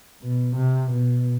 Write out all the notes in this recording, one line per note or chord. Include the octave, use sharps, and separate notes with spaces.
B2
C3
B2